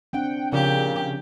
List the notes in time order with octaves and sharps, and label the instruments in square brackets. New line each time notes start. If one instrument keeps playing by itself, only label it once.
[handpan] C4 D4 F#5 [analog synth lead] G5
[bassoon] A#2 [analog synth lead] C#3 [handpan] F3 [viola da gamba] G4